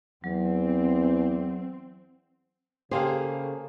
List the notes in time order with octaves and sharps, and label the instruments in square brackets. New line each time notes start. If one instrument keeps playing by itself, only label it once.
[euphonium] E2 [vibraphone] F#3 [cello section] C4
[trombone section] C#3 [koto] A3 A#3 G#4 [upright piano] G4 F5 [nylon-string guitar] C5